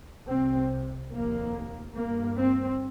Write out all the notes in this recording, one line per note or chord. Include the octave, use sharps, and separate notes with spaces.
C2 C3 C4
F1 D#2 A#3
G1 G2 A#3
C4